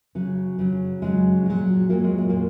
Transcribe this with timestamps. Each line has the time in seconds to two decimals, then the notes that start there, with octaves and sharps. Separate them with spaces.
0.15 C#3 F#3
0.59 C#3 F#3
1.02 C#3 F#3 G#3
1.46 A#2 F#3
1.89 A#2 F#3 A#3
2.04 G#3
2.18 G#3
2.29 A#2 A#3